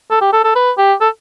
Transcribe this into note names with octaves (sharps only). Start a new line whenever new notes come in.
A4
G4
A4
A4
B4
G4
A4